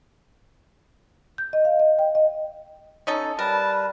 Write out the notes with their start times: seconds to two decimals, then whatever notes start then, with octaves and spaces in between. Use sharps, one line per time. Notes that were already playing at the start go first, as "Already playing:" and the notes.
1.38 G6
1.53 D#5
1.65 F5
1.80 D#5
1.99 G5
2.15 D#5
3.07 C#4 D#4 A4
3.39 G3 A#4 B4 A5